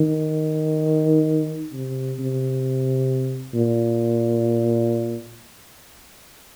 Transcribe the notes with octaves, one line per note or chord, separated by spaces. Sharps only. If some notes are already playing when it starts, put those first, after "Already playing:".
Already playing: D#3
C3
C3
A#2